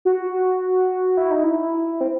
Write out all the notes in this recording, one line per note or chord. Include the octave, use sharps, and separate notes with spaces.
F#4
E4
D#4
E4
C4